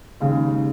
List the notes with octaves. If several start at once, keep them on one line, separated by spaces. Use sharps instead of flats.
D#2 C#3 G#3